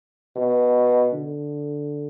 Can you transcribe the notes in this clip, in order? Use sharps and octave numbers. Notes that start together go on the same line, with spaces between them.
B2
D3